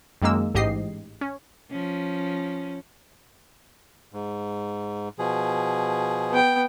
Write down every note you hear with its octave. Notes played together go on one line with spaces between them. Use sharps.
F#2 D#3 G#3 A#3 E6
A1 G#2 G4 D#5 C7
C#4
F3 C#4
G#2
B2 F3 G#4
B3 G5